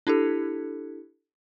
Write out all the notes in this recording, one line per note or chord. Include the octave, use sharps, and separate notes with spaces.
D4 E4 G4 A4